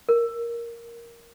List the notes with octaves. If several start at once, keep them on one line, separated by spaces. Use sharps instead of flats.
A#4